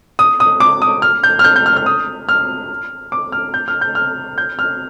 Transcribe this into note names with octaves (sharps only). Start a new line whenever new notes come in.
D#6
D#6
D6
D#6
F6
G6
F6
G6
G6
F6
F6
D#6
F6
D6
F6
G6
F6
G6
F6
G6
F6